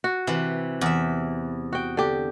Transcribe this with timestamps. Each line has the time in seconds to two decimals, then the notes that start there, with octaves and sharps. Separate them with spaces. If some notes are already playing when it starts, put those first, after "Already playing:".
0.04 F#4
0.27 C3 E3
0.81 E2 E5
1.73 F#4 G5
1.97 D3 G4